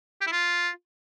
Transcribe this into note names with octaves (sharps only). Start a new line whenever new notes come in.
G4
E4
F4